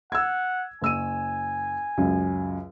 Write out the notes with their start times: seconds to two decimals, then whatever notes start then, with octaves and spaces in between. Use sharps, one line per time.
0.12 F#5 E6 G#6
0.82 F#1 G#5 E6 D#7
1.98 C#2 F#2